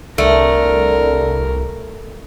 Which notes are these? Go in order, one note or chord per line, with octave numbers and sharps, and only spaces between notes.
C2 D3 A3 A#4